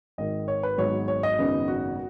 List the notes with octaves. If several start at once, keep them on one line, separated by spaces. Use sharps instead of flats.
G#1 G#2 D#3 D#5
C#5
B4
G#1 G#2 F#3 B3 D#4 C#5
C#5
D#5
G#1 F#2 C#3 B3 D#4
F#4